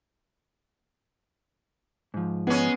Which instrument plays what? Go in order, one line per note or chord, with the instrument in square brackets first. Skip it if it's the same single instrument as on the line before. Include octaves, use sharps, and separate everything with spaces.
[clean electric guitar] G#2 F3
[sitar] G#3 C#4 [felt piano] B3